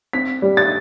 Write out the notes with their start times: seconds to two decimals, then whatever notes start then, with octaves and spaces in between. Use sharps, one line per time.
0.13 C4 B6
0.42 G3
0.57 A6